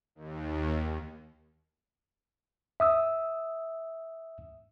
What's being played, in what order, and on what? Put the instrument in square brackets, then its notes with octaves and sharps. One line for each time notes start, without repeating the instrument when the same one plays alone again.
[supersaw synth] D#2
[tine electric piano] E5 D#6 E6